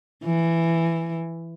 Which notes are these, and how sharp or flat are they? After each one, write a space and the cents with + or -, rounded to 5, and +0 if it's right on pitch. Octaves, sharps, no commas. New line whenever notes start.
E3 +10